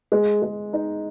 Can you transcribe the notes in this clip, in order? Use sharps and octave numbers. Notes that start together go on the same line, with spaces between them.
G#3
G#3
D#4